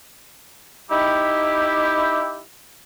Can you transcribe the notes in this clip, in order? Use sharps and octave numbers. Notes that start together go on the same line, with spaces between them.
D#4 E4 G4